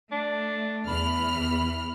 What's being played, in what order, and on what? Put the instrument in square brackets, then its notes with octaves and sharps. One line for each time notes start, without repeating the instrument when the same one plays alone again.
[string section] A3 [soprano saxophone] D4
[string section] E2 E3 F6 [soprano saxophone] B5